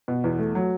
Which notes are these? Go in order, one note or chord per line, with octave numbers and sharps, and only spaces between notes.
B2
E2
A3
F#3